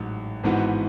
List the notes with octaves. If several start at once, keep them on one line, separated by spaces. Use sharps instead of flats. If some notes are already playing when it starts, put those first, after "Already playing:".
Already playing: A1 G#2 F#3
G#1 G#2 E3 B3 F#4